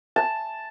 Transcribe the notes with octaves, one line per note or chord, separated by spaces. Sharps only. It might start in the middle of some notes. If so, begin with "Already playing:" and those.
A5